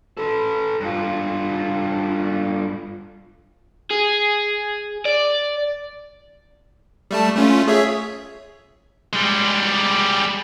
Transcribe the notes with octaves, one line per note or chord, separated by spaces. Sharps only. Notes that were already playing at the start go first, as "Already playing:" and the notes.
A4 B4
G2 F4
G#4
D5
G3 A3 A5
A3 C#4 F4
G#4 C#5 E5
G3 G#3